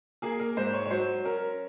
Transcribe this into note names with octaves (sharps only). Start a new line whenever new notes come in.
A#3 G#4
A#4
G#2 C5
C#5
C#5
F#3 C5
C#4 A#4